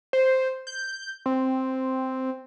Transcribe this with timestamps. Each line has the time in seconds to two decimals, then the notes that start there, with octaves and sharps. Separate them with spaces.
0.13 C5
0.67 G6
1.26 C4